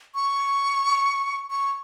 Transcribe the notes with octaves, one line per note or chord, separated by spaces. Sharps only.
C#6
C#6